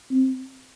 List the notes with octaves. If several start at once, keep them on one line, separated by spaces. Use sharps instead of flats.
C4